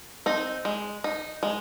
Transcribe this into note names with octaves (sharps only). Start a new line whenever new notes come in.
C4 D#4
G#3
D#4
G#3